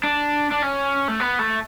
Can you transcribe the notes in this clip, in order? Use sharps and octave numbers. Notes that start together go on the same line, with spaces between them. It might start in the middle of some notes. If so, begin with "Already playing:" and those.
D4
D4
C#4
A3
B3
A3